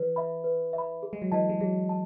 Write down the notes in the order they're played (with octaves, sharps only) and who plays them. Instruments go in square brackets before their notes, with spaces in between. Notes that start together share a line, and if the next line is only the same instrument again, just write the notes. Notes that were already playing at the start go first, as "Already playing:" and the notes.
Already playing: [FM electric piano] E3 [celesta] B4
[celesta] E5 B5
B4
E5
B5
G#4
[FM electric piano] G#3
F#3
[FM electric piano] E3 [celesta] D#5 A5
[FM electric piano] G#3
[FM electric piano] F#3 [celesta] G#4
[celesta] A5